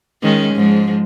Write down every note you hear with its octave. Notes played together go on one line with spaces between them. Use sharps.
D#3 G#3 C#4
G#2 F3 G#3